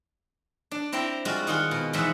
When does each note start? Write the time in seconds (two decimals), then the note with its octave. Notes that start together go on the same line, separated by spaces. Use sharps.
0.71 D4
0.92 C4 E4 G5 A#5 C6
1.25 G3 G#3 F4 F#4
1.47 D#3 F4 G#4 F5 F#5 C6
1.71 B2
1.93 E2 G#2 F3 E5 F#5 B5